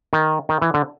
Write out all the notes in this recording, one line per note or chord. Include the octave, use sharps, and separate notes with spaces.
D#3
D#3
E3
D3